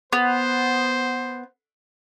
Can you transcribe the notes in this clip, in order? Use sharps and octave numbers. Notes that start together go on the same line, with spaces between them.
B3 C5